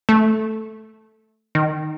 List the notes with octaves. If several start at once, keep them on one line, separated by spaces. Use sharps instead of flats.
A3
D#3